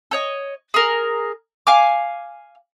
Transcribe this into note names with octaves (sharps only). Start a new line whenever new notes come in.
A4 C#5 D#5
G#4 A#4
F5 G#5 D6